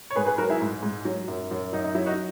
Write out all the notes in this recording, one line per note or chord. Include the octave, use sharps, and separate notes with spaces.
C#5
G#2 G#4 B4
G#4 B4
F#3 F#4 A#4
E4 G#4
G#2
G#2
F#3
F#2
F#2
F#2 D#4
D#4
F#3 E4
D#4 F#4